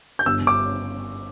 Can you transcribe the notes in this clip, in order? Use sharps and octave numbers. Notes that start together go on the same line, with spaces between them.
G6
G1 E6
G1
D6